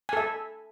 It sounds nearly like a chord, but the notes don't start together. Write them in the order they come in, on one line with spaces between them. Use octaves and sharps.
G#5 A4 E5